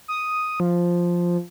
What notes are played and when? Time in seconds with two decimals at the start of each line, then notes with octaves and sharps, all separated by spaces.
0.08 D#6
0.60 F3